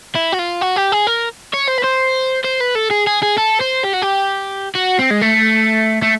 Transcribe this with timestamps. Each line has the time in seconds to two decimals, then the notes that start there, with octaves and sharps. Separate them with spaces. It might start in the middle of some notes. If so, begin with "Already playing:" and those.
0.15 E4
0.32 F#4
0.39 F4
0.61 F#4
0.76 G4
0.92 G#4
1.07 A#4
1.54 C#5
1.68 C5
1.78 B4
1.84 C5
2.45 C5
2.61 B4
2.75 A4
2.91 G#4
3.07 G#4
3.22 G#4
3.38 A4
3.60 C5
3.83 G4
3.93 F#4
4.02 G4
4.75 F#4
4.99 C4
5.10 G#3
5.21 A3
6.02 A3